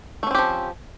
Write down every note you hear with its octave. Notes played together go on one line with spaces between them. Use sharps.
F3 A3 C4 C#4 G4